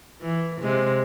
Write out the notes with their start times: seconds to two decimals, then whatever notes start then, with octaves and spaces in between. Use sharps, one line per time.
0.22 E3
0.62 C3 G#3